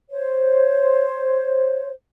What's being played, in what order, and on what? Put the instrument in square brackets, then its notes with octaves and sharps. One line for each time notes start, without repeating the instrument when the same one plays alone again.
[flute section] C5 C#5